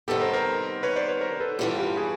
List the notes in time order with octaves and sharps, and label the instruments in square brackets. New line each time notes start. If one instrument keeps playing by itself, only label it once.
[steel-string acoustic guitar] C3 D#3 G3 B3 [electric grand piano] G4 A4
[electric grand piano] A#4 C5
A#4 C5
B4 C#5
C5 D5
B4 C#5
A#4 C5
A4 B4
[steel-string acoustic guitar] G2 E3 G3 B3 [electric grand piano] F4 G4
[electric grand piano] F4 G4
F#4 G#4